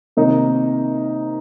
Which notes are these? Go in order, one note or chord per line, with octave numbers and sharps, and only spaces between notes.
C3 D#3 A#3 D#4